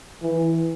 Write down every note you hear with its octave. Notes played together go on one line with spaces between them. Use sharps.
E3